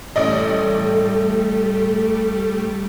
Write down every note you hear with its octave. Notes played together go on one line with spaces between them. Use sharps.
A1 G3 A3 G4 A4 D5 D#5